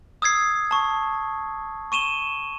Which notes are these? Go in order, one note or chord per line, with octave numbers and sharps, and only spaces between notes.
D#6 E6 G#6 C7
A5 C#6
C#6 D#7 E7 G7